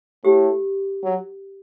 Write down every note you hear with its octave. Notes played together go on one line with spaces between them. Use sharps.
A2 G4
F#3